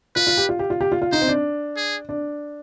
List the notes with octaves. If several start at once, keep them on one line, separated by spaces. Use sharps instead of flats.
F4 B4
F4
G4
F4
G4
F4
G4
F4
F4
D#4 C5
C4
D4
G#4
D4